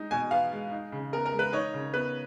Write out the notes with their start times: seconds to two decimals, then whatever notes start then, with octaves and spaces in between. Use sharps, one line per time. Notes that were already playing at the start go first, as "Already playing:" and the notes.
Already playing: G#3 D#4
0.11 B2 G#5
0.31 B3 F5
0.52 G#3
0.71 D#4
0.92 C#3
1.13 B3 A#4
1.25 A#4
1.33 G#3
1.39 B4
1.53 D#4 C#5
1.74 C#3
1.94 B3 B4